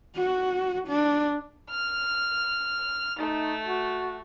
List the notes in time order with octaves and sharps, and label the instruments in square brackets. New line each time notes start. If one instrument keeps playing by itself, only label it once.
[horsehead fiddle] F#4
D4
[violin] F6
[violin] A3 [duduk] D#4
[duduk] F#4